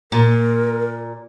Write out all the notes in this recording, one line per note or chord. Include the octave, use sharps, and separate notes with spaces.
A#2 A#4